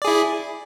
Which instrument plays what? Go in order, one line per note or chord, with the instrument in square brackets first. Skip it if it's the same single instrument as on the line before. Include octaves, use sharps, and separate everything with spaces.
[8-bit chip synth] D5
G#4
E4